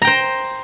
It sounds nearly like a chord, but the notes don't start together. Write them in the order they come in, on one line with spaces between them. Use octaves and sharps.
A#5 G5 C5